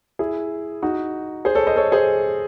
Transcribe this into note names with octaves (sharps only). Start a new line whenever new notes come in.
E4 G#4
D#4 F#4
G#4 C5
A4 C#5
C5 D#5
A4 C#5
G#4 C5